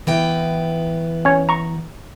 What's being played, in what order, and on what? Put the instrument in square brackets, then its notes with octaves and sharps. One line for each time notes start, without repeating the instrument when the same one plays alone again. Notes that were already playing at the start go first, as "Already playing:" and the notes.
[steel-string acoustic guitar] E3 B3 G5
[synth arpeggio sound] C#4 C#5
A#5 C#6